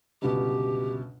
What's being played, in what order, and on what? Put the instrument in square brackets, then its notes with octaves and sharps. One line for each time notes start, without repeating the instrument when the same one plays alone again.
[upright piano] G1 C#2 B2 [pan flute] G4